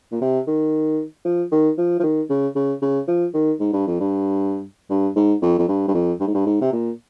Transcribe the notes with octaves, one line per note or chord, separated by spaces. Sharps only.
A#2
C3
D#3
F3
D#3
F3
F3
D#3
C#3
C#3
C#3
F3
D#3
G#2
G2
F2
G2
G2
G#2
F2
F2
G2
G2
F2
G2
G#2
G2
G#2
C3
A#2